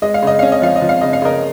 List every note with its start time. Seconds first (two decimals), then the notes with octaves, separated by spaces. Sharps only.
0.02 G#3 D#5
0.14 F5
0.22 C#3 D#5
0.39 C#4 F5
0.52 D#5
0.62 F3 F5
0.76 D#5
0.82 F3
0.89 F5
1.01 C#3 D#5
1.13 F5
1.22 C#3 A#4 D#5